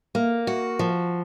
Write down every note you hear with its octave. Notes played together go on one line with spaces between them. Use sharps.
A#3
F#4
F3